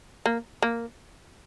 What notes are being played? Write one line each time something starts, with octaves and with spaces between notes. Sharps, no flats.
A#3
A#3